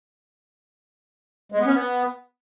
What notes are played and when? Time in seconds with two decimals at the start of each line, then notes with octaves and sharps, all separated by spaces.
1.52 G#3
1.59 B3
1.66 C#4
1.74 B3